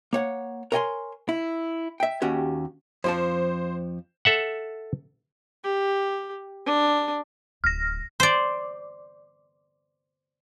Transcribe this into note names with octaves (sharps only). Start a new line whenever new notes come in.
A#3 C#5 F#5
A#4 C#5 D#5 G5 G#5 C6
E4
E5 G5
D#2 C#4 F#4 G4
F2 F3 C5 A5
A4 E5 F#5
G4
D4
D1 F6 A#6
C5 D5